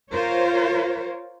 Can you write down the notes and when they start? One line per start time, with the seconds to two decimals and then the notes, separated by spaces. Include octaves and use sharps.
0.11 F4 A#4 C5 C#5